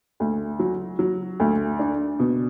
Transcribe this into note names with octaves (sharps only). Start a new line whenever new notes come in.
D2
F#3
F#3
D2
D4
B2